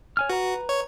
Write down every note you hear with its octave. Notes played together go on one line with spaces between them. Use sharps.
C#5 G#5 F6
F#4 B4 A#5
C#5